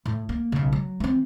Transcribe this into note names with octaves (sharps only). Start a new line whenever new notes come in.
A2
A#3
B1 C#3
F#3
E3 C4